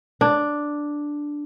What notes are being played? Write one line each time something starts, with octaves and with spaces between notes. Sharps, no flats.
D4